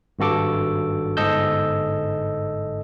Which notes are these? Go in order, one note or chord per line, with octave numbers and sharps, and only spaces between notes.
G#1 G2 F#4 A4 D6
G1 G#2 A4 D#5 E6 G6